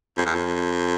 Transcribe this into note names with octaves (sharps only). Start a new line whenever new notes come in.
F2
E2
F2